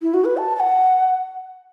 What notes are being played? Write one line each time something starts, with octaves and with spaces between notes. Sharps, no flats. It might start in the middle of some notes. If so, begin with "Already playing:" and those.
E4
F#4
B4
A5
A5
F#5